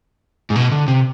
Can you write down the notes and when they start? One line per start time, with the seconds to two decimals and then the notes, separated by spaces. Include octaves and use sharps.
0.50 G#2
0.56 B2
0.72 D3
0.88 C3